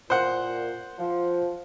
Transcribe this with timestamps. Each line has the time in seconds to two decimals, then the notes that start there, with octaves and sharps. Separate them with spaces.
0.10 A#2 C5 F#5
0.98 F3